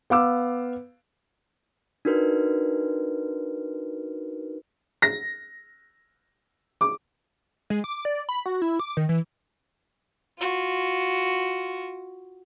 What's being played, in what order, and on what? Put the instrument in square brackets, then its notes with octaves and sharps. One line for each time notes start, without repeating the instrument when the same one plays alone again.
[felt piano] B3 F5 D6 E6
[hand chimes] D4 D#4 F#4 A#4 B4
[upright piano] A#6
D6
[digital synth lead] G#3
D6
D5
B5
F#4
E4
D6
D#3
E3
[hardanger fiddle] F4 F#4